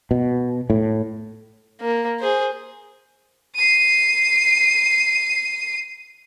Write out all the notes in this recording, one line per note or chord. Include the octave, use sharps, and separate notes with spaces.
B2
A2
A#3
G#4 C5
C7 D#7